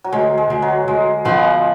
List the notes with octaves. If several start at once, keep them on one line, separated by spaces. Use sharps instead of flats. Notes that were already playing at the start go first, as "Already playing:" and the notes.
F#3
D2 G#3
G#3
D2
F#3
D2 G#3
F3 G#3 B3